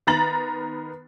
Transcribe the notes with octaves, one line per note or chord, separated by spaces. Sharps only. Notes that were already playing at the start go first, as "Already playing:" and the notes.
D#3 B3 A#5 A6 F#7